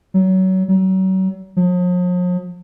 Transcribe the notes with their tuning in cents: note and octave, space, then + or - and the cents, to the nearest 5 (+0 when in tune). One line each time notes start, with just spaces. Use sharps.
F#3 +25
F#3 +35
F3 +45